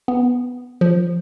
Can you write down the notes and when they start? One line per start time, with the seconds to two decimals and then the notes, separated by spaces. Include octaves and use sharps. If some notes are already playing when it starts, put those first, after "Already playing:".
0.08 B3
0.81 F3